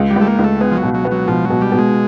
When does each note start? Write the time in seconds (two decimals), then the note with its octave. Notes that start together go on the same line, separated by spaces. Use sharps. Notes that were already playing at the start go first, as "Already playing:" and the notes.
Already playing: C#2
0.10 G3
0.16 C#2
0.21 A3
0.27 A#3
0.39 C#2
0.44 A3
0.60 G#3 B3
0.72 F3
0.77 F#3
0.83 B2
0.94 F#3
1.05 B3
1.11 F#3
1.28 B2 F3
1.45 F#3
1.50 B2
1.61 G3
1.72 B2
1.78 G#3